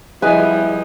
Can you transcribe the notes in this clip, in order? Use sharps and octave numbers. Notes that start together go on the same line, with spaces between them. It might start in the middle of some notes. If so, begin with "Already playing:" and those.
F3 G3 E4 G#4 B4 D#5 G#5